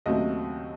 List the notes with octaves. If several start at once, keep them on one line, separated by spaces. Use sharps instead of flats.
D#2 C#3 F#3 A3 C4 D#5